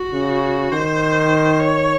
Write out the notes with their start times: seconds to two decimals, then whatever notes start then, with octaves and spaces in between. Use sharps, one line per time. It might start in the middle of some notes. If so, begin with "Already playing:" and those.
Already playing: F#4
0.13 C#3
0.72 D#3 C5
1.60 C#5